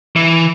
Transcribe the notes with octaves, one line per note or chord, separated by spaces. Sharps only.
E3